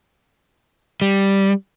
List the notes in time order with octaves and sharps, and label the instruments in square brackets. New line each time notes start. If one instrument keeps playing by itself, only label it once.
[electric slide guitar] G3